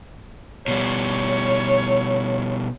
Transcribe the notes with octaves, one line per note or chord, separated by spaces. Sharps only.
B2 G3 C#5